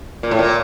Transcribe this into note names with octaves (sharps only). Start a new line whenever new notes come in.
A#2
A2
A#2